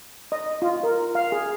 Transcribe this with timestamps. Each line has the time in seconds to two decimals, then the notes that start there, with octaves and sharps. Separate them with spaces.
0.32 D#5
0.62 F4
0.83 A#4
1.15 F5
1.32 G#4